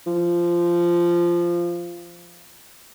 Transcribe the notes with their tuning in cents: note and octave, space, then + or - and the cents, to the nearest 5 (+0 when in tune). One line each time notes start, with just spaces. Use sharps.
F3 -15